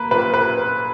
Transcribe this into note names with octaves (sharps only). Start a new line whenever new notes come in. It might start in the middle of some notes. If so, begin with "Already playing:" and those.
Already playing: A#3 B4
A#2 B4
B4